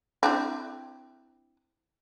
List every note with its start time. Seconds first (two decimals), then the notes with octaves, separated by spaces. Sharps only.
0.23 C4 D4 E4